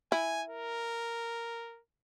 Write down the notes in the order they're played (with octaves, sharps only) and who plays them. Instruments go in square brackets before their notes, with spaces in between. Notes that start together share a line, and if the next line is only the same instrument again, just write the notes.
[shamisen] E4 [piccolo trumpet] G#5
[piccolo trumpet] A#4